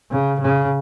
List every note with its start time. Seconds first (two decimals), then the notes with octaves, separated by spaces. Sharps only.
0.11 C#3
0.40 C#3